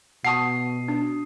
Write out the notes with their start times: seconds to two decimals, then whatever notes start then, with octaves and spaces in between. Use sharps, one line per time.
0.25 B2 F#5 A5 C#6 D#6 C7
0.88 D4